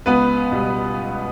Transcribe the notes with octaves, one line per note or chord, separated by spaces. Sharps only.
C#2 B3 B4
B2 G3